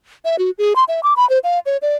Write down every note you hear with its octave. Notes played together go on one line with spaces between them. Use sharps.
E5
F#4
G#4
C6
E5
D6
B5
C5
F5
C#5
D5